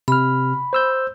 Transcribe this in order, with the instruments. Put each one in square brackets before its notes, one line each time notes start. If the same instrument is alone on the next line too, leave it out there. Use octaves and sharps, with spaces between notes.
[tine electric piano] C3 F6 [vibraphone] B5
[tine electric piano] C5 E6 G6